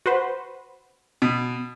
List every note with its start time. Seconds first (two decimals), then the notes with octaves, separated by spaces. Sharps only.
0.06 F#4 B4 C5
1.22 B2